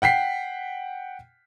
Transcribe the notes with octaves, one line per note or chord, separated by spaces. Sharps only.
F#5 G5 B6 C7